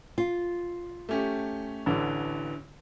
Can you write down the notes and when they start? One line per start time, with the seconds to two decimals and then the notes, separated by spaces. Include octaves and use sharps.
0.18 F4
1.09 A3 C#4 G4
1.86 A1 D3 E3